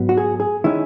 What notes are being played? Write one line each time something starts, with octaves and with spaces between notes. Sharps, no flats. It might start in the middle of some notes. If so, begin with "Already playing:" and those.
Already playing: G#2 F#3 B3
F#4
G#4
G#4
D#3 G#3 C#4 E4